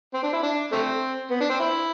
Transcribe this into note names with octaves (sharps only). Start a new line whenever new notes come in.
C4
D4
E4
D4
A3 C4
B3
D4
C4
E4